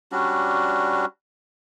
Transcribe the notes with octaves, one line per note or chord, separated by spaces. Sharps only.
G3 C#4 D4 F#4